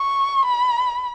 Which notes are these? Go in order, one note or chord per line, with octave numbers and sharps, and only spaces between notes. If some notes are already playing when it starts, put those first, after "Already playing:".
Already playing: C#6
B5